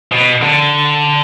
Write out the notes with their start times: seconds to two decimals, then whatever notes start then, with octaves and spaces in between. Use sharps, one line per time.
0.12 B2
0.41 D3